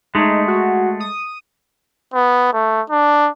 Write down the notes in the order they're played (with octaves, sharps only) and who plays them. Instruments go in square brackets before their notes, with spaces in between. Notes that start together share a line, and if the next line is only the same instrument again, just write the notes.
[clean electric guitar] G#3 A3 [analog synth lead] D#4
[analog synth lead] F#4
D#6
[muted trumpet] B3
A3
D4